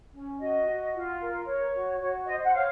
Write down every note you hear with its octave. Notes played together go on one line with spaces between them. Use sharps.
C#4
F#4 D#5
F#4
F4
A#4
C#5
F#4
F#4 C#5
C5 D#5
F#5
C#5 F5